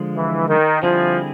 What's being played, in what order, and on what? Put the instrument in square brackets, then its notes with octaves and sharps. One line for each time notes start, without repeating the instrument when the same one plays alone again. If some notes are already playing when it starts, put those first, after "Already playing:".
Already playing: [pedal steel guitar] D3 F3 G#3
[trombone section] E3
D#3
[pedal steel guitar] D3 G3 C4 E4 G#4 [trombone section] F3